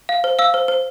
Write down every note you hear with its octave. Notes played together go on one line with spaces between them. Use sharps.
F5
C5
F5 E6
C5
C5